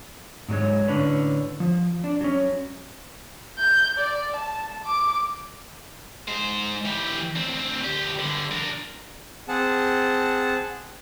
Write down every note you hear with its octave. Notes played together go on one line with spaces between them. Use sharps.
G#2 F#3 G#3 C#5
A2 D3 C#4 D4 B4
F3
D4
F#3 C#4
G6
D5
A5
D6
G#2 C5
E3 G4
D2 C4
D2 G4
G2 D3
D4 A#4
C4 G#4 F#5 A5